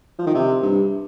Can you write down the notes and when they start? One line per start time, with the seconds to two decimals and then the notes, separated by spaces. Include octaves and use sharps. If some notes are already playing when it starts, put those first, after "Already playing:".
0.19 F3
0.26 D#3
0.34 C3
0.62 G2